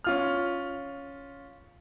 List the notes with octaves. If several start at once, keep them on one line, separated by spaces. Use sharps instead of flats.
C#4 F4 F6